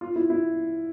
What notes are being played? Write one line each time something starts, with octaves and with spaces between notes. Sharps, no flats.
F4
E4
E4